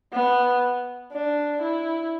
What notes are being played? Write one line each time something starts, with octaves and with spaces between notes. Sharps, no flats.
B3
D4
E4